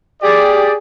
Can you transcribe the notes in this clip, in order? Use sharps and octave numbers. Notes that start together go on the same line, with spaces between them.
G4 G#4 D5